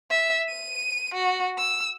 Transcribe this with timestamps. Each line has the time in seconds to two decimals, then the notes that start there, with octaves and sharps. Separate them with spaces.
0.11 E5
0.48 D#7
1.14 F#4
1.57 E6